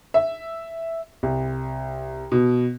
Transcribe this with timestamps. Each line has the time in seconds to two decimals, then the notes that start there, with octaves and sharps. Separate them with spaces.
0.14 E5
1.23 C2
2.32 B2